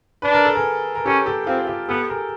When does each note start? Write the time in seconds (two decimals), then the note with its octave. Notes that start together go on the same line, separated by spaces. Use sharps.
0.22 D4 B4
0.33 A#4
0.45 A4
0.55 G#4 A#4
0.95 A#4
1.06 C#4 G4 A4
1.26 G4 A4
1.47 C4 F4 G4
1.67 F4 G4
1.89 B3 G4 A4
2.09 G#4 A#4